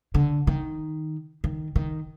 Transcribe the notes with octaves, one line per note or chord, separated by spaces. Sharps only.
D3
D#3
D#3
D#3